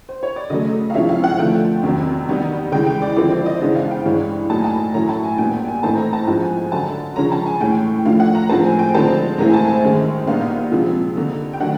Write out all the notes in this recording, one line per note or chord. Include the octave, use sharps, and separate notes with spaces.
C5
C#5
D5
C#3 F#3 A3 D#5
F5
C3 F3 G#3 C#4 E4 E5
F5
F#5
D3 F3 A3 G5
E2 C3 D#3 F#3
D#3 G3 B3 D#4
C#3 E3 G#3 G5
G5
D5
D3 F3 G#3 C4 E4 D5
D5
D#5
C#3 E3 G#3 B3 D4
F5
G5
G2 E3 G#3 C#4
A2 F#3 A#3 D#4 A5
G#5
A5
A2 F#3 A3 C#4 E4 A#5
A5
G#5
A#2 G3 B3 G5
G5
G#5
G#2 E3 A3 C4 D#4 A5
A#5
A5
G#2 F3 G#3 B3 A5
G#5
G#5
F#2 D3 F#3 A5
C#3 F3 G#3 C#4 A#5
A5
G#5
A2 E3 G#3 C#4 G5
A2 F3 A3 D4 F5
F#5
A#5
A2 F3 G#3 C4 A5
G#5
G5
D3 F3 G#3 C4 D#4 A5
A2 E3 G#3 C4 E4 A#5
G#5
A5
G#5
F#2 D#3 G#3
A#2 G3 B3 D#4 F5
C3 F3 G#3
D3 G3 A#3 D#4
G5
D#3 F#3 A3 D4 F#5